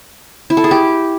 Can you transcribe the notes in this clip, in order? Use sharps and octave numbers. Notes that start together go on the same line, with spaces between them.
E4
A4
G#4
G4